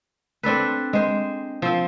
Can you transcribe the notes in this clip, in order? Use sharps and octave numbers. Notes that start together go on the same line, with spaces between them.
C4 D4 A4 B4
G#3 C5
F3 C4